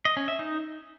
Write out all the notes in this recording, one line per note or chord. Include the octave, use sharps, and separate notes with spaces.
D#5
C#4
E5
D#4